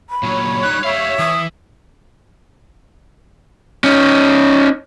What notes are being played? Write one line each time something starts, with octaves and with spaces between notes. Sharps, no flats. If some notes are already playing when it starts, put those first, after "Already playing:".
B5
A#2 F#3 C#5
G3 D#4 F#6
G4 E5 F5
E3 D#6
C#4 D#4